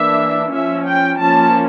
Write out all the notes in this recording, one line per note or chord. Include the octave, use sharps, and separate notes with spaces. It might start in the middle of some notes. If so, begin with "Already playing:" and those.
Already playing: E3 A#3 D4 E5
F3 C#4 E5
G5
F3 A#3 C#4 A5